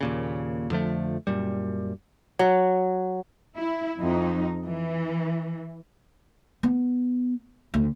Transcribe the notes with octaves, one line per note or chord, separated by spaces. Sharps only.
D#2 A#2 C#3
F2 D3 F3 A3
F#2 A#2 G3
F#3
E4
F2 D#4
E3
B3
D2